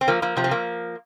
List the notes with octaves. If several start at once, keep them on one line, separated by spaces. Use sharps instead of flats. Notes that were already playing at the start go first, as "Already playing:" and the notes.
C4
F3 A#3
F3 A#3
C3 F3
C4
F3 A#3